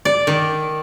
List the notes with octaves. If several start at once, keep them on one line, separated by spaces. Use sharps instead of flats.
D5
D#3